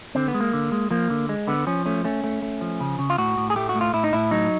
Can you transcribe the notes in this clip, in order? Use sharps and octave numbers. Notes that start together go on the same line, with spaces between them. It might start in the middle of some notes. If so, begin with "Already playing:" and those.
D3 C4
B3
G#3
A#3
D3
G#3
F3 A#3
D3
G#3
D3 B3
F3 C#4
A3 C#4
A3 C#4
A3
A3
F3
C#3
C#3
F4
A2 F#4
A2
G#4
A3 G4
F#4
A2
F4
A2 E4
D#4
A2 E4
F#3 D#4